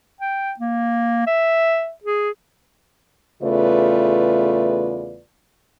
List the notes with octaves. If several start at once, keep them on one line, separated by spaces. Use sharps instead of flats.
G5
A#3
E5
G#4
E2 C#3 A3 F4 B4 D5